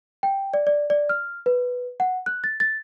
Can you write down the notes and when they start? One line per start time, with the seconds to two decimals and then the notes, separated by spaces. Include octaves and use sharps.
0.23 G5
0.54 D5
0.67 D5
0.90 D5
1.09 F6
1.46 B4
2.00 F#5
2.26 F#6
2.44 A6
2.60 A6